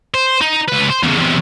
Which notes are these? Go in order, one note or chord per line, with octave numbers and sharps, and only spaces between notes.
C5
D#4
C#2 B4
C5
E2 C#3
E2 C3